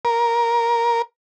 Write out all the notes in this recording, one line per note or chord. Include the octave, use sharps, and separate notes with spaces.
A#4